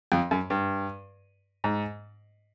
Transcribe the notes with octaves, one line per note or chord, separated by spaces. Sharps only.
F2
F#2
G2
G#2